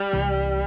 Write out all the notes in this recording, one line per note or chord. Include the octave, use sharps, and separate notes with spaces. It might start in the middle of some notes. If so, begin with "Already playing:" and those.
Already playing: G3
C2 C3 E3